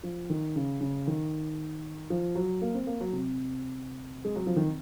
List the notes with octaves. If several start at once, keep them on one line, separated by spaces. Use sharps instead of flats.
F3
D#3
C#3
C#3
D#3
F3
F#3
A#3
C4
A#3
F#3
C3
G#3
F#3
F3
D#3